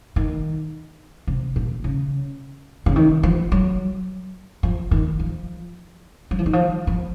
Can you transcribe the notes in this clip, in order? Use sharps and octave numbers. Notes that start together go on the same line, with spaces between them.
D#3
C3
A#2
C#3
C#3
D#3
F3
F#3
F3
D#3
F3
F#3
F3
D#3
F3
F3